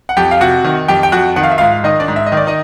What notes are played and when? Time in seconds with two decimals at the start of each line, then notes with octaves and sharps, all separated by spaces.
0.09 F#5
0.17 F2 G4 G5
0.31 F5
0.41 C3 F#4 F#5
0.65 D#3
0.88 F2 G4 G5
1.03 G5
1.12 F2 F#4 F#5
1.36 D#3 F#5
1.43 F5
1.51 E5
1.58 G#2 F4 F5
1.84 D#3 D#4 D#5
2.00 D4 D5
2.08 G#2
2.16 E5
2.26 D#5
2.32 D#3 D5
2.47 D#4 D#5